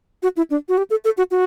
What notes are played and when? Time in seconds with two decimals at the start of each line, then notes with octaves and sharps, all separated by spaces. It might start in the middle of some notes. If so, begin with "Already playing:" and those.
0.23 F#4
0.37 E4
0.50 D4
0.69 F#4
0.78 G4
0.90 A4
1.05 A4
1.18 F#4
1.31 F#4